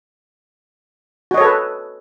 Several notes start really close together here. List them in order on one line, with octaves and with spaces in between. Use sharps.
F#4 D#5 C#5 A4 B4